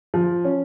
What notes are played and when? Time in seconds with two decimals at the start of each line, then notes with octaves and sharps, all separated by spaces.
0.14 F3
0.45 C#4